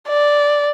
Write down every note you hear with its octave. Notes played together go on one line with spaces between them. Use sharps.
D5